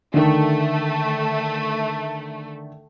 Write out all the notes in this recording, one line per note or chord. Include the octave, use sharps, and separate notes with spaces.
D3 D#3 A3